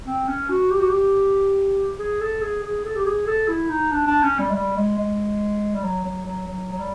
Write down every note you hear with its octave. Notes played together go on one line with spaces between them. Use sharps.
C4
C#4
F#4
G4
F#4
G4
G#4
A4
G#4
G#4
A4
G4
G#4
A4
E4
D#4
D4
D4
C#4
G3
G#3
G3
G#3
G#3
G3
F#3
F#3
F#3
F#3
F#3
G3